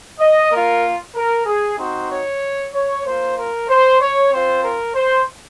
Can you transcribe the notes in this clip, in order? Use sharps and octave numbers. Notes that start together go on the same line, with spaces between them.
D#5
A#3 F4 A#4
A#4
G#4
C4 D#4 F#4 C5
C#5
C#5
A#3 F4 C5
A#4
C5
C#5
C4 F4 C5
A#4
C5